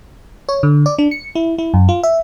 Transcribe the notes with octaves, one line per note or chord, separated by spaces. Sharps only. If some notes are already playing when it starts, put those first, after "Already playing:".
C#5
D3
D5
D4
C#7
E4
E4
F#2
F4
E5